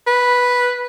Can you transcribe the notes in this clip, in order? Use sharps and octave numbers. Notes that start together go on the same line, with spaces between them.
B4